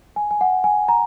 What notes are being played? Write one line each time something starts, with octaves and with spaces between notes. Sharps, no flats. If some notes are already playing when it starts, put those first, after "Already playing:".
G#5
G#5
F#5
G#5
A#5